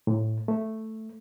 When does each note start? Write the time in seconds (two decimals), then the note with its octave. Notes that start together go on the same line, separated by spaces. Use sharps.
0.07 A2
0.48 A3